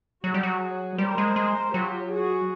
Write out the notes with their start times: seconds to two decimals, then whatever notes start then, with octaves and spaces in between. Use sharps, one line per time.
0.23 F#3 F#4 G#4
0.34 G3
0.43 F#3
0.98 G3 A#4 C5
1.18 G#3
1.36 G#3
1.73 F#3 F4 G4
2.11 F#4 G#4